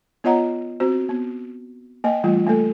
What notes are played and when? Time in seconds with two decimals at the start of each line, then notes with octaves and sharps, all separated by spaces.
0.24 B3 F4 C#5 D#5 F#5 A#5
0.80 C4 F#4 C5
1.09 B3
2.04 A#3 D#5 G5
2.24 E3 G3 A3 F4
2.47 A3 A#3 A4